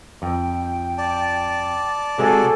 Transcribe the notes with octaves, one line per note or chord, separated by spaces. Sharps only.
F2 G5
D5 A5
C3 G#3 F#4 G#4 A4 G#5